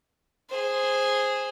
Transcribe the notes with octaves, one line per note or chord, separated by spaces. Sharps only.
G#4 C5